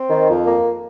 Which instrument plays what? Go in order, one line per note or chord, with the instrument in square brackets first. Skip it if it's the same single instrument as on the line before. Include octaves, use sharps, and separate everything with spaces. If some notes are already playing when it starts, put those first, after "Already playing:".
Already playing: [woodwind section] C4
D#3
F2
A#3